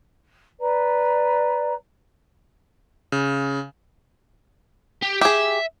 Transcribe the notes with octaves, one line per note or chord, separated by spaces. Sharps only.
B4 D5 A#5
C#3
G4
G4 G#4 E5